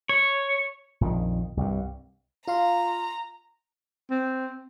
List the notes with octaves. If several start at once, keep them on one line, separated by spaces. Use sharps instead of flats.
C#5
A#1 F2 D3 D#3
C2 G2
F4 F5 A#5 C6
C4